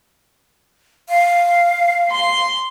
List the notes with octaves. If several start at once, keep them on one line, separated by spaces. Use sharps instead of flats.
F5
C6